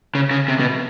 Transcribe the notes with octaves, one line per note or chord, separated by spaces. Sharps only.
C#3
C#3
C3
B2